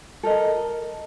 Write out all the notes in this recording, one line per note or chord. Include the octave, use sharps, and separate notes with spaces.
A4 A#4 D#5